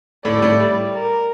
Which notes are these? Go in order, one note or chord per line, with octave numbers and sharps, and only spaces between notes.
A2 A3 D5
G3
A2 A3
G3
A#4